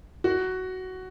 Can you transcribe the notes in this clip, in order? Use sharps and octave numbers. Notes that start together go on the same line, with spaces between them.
F#4